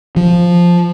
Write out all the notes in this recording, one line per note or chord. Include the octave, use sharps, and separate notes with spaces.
F3